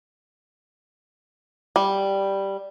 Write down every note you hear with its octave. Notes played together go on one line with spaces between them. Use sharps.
G3